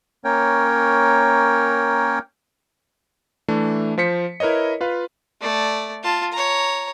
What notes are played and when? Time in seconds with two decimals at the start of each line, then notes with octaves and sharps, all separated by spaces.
0.25 A#3 C#4 A#4 C#5 G5
3.48 E3 A3 D4
3.98 F3 C5 B6 C#7
4.40 E4 A#4 B4 C#5 D#5
4.81 F4 B4 F5
5.41 A3 D5
6.03 F4 A5
6.32 C#5 A#5